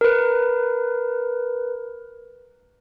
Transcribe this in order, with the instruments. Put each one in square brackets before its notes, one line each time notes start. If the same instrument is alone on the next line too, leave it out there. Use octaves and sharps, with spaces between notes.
[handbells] A#4 B4